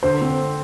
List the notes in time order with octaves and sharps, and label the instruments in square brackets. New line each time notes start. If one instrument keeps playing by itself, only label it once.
[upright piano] D3 [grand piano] C5
[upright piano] C4